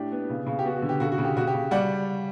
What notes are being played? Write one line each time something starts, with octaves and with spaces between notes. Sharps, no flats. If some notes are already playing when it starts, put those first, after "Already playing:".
Already playing: A2 D4 G4
B3
C#3
C#3
G4
B3 F#4
F#4
D3
G4
C#3 F#4 A4
F#4
C#3
G4
C#3 F#4
G4
C#3
G3 D5 F#5